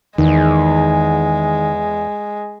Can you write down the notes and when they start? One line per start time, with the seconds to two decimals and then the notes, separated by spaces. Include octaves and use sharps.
0.18 E2 D#3 G#3